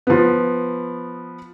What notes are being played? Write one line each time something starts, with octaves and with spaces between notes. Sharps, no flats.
F3 B3